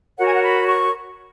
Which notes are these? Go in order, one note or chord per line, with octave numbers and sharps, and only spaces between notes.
F#4 A#4 C#5 F#5
G#5
F#5
B5
C#6